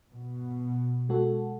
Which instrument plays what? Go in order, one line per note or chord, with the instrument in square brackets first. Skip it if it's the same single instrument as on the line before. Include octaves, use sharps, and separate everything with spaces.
[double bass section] B2
[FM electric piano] G#3 F#4 A4